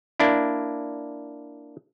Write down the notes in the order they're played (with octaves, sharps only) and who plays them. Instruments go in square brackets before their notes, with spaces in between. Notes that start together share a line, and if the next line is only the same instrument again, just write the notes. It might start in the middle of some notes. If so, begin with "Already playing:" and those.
[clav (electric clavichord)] A#3 D4 E4